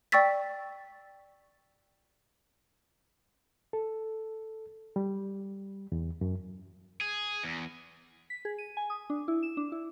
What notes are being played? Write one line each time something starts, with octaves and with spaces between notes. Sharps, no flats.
D5 G5 C#6 E6 A6 B6
A4
G3
E2
F#2
G#4
E2
B6
G#4
D#7
G#5
D#6
D4
E4
E7
D4
E4